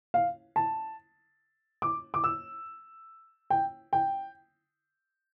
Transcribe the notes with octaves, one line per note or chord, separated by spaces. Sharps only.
F5
A5
D6
D6
E6
G5
G5